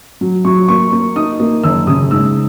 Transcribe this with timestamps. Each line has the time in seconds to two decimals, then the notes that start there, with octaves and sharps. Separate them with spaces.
0.21 F#3
0.45 F#3 C#6
0.68 A#3 C#6
0.92 A#3
1.16 D#4 D#6
1.40 A#3
1.64 F#1 E6
1.87 C#3 D#6
2.11 G#2 E6